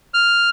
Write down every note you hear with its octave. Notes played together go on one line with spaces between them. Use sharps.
F6